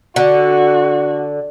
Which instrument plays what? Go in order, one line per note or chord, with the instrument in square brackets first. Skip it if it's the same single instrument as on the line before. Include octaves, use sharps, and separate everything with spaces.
[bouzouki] D3 [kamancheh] F#4